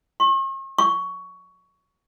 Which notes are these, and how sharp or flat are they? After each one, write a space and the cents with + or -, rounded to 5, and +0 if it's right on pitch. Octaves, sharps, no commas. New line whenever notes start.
C#6 -45
C#6 +15